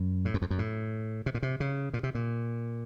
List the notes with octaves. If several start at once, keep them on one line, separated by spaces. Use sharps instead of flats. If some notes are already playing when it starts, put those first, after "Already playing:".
Already playing: F#2
A2
F#2
F2
F#2
A2
C3
A#2
C3
C#3
A#2
C3
A#2